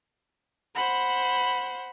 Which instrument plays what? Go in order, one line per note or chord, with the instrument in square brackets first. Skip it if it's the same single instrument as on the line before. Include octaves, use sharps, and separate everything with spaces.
[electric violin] C5 F#5 [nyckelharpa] B5